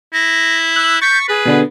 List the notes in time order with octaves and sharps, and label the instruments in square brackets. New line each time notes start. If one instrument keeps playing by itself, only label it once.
[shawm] E4 [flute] A#6
[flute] E6 [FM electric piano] F#6
[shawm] C#6 [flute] G6 [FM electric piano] A6 B6
[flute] G#4 [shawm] B4
[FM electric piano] B2 D3 B3